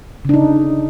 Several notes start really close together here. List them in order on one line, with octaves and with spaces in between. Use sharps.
C#3 D4 D#4